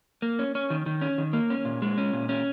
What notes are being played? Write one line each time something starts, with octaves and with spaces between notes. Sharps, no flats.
A#3
C#4
C#4
D#3
D#3
C#4
D#3
A#3
C#4
A#2
G#3
C#4
A#2
C#4